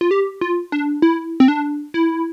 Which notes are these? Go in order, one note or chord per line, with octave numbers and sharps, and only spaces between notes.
F4
G4
F4
D4
E4
C4
D4
E4